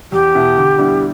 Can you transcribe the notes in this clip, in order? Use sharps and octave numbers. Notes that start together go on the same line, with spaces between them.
E2 G4
B2 B3 E4
D2
D3 G3 B3 E4